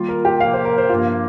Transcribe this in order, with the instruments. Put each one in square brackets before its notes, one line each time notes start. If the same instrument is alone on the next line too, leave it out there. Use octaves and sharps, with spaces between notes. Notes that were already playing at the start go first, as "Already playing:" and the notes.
Already playing: [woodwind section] D#3 G3 A#3 F4
[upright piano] A#4
G4
[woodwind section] C3 F3 A#3 [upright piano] F5
[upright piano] C5
A#4
C5
[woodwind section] G2 F3 A#3 [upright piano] F4